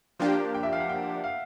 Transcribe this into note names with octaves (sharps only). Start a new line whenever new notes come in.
F3 A#3 D4 G4
G5
E5
F5
F#5
G5
F5